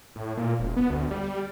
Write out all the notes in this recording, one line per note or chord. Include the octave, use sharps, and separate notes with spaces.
A2
A#2
E1
B3
D2
G3